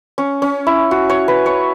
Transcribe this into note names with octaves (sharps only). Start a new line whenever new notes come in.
C#4
C#4
E4
F#4
C#5
B4
C#5